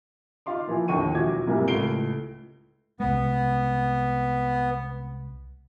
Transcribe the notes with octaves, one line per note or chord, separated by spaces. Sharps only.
D#4 F4 F5 C6 D6
A#2 E3 F3
A1 D#2 D3 G5 C#6 D#7
E1 A#1 A#2 F#4 D6 G#6
B1 G#2 C3 E3 G3 A#3
C#2 A2 A3 C7 D7 G7
C2 G#3 B3